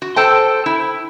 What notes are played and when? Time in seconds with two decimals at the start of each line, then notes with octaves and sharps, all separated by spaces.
0.02 F#4
0.16 A4 C5 G5 A5
0.66 E4